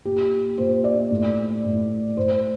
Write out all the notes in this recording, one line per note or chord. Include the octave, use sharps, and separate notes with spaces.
A#2 G4
A#2 C5
D5
A2
A2
A2 C5